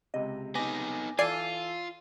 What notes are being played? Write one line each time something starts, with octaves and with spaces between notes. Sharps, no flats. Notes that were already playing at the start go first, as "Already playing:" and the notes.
C#2 C3 D#5
B3 D#4 G#5 D6 A#6
E3 F4 A4 D5 G#5 C7 D#7